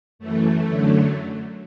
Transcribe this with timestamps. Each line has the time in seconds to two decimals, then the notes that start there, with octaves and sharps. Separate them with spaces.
0.19 F#2 E3 A3
0.65 F#2 D3 F#3